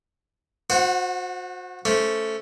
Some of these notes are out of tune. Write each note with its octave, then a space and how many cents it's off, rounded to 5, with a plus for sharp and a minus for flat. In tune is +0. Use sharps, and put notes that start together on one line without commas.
F#4 -35 C5 +0 F#5 +0
A3 +0 C#4 +10 C5 +0